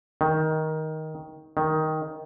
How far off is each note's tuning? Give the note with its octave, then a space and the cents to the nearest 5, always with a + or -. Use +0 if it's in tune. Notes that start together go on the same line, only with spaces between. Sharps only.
D#3 +10
D#3 +5